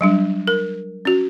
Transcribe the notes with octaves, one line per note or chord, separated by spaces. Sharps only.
F#3 G3 D4
A#4
C#4 F#4